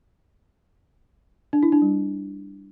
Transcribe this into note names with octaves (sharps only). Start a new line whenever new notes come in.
D4
E4
D4
G3